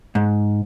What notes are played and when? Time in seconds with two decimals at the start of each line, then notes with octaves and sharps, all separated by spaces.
0.15 G#2